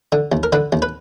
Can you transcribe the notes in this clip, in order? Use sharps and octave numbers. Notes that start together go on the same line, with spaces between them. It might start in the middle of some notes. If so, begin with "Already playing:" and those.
D3
D#2
A#4
D3 B4
D#2
B4